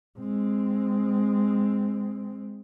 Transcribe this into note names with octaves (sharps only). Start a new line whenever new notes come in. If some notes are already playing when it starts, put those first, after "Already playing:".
G#3 C4